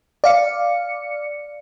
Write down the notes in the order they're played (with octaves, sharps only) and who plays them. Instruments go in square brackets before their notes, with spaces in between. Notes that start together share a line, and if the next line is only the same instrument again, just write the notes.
[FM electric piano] D5 F5 C#7